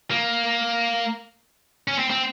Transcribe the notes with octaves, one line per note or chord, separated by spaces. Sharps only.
A#3
C#4
C4
C4